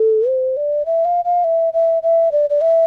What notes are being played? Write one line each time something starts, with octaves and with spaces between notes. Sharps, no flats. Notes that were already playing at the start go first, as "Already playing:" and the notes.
Already playing: A4
C5
D5
E5
F5
F5
E5
E5
E5
D5
D5
E5